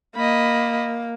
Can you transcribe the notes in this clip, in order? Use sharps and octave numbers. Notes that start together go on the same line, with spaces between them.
A#3 D#5 B5